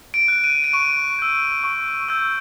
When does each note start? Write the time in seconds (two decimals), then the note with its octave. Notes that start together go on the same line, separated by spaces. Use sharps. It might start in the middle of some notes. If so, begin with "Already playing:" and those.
0.14 D7
0.28 F#6
0.44 D#7
0.64 D7
0.73 C#6 D#7
1.19 E6 G6
1.64 C#6
2.08 E6 G6